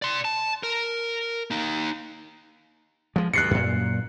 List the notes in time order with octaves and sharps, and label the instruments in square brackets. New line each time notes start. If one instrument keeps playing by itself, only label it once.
[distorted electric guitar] D5 C6
A5
A#4
A#3 D#4
[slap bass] F3 G#3
[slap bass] D2 G2 [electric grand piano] F#6 C7 C#7
[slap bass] F#2 A#2